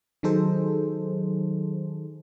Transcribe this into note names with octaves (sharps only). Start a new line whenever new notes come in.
D#3 F#3 D#4 G#4 A4 C5